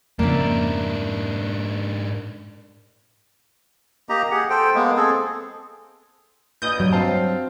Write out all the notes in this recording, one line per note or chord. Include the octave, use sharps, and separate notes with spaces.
F2 G#2 C#3 A#3 D4 E4
A#3 G4 D#5 A#5
G4 G#4 F#5
A4 C5 G5
G#3 A#3 B3
C4 G#4 A4
A#1 B4 D#5 D#6 G6
G2 F#3
C4 F5 A5